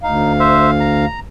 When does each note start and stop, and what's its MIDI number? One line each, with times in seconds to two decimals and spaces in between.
0.03 1.05 38
0.03 0.33 63
0.03 1.05 77
0.40 0.71 72
0.40 0.71 76
0.80 1.20 82